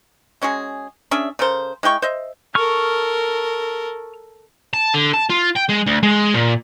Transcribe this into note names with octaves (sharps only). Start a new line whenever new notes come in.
G#3 C#4 F#4 G#4
C#4 D4 G#4 E5
C#3 A4 A#4 C5
G#3 E4 G5 C#6
C5 D#5 E5
A4 A#4 C#6 F6
A5
D3
A5
F4
G5
G#3
D2
G#3
A#2